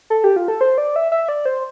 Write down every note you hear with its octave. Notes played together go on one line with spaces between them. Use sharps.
A4
G4
F4
A4
C5
D5
E5
E5
D5
C5